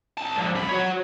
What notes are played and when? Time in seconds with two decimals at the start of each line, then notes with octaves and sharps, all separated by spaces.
0.18 C2 A5
0.38 D3 F3
0.55 F2 B5
0.69 F#4 C#5